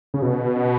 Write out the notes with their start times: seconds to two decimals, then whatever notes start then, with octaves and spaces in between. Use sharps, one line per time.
0.14 C#3
0.22 B2